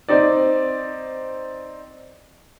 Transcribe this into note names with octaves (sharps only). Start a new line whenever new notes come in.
C4 D#4 D5